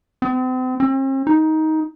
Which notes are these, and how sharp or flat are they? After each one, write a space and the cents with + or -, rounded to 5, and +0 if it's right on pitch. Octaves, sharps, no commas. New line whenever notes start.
C4 -40
C4 +45
D#4 +15